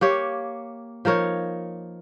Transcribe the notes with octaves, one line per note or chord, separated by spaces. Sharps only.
A#3 G4 C#5
F3 D#4 A#4 C#5